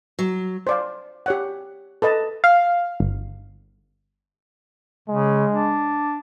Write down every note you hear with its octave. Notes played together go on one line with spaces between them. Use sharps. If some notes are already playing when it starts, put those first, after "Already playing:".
F#3
C5 D5 F5
G4 C#5 F#5
A4 B4 D#5 A5
F5
G1
C#3 G#3
D4